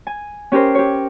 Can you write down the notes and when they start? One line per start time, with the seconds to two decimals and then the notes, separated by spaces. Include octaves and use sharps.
0.07 G#5
0.52 C#4 G4 A#4 C5
0.75 G4 C#5